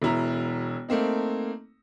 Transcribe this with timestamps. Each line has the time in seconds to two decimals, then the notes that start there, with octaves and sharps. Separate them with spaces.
0.02 E1 B2 E4 A#5
0.89 A3 A#3 C4 D#4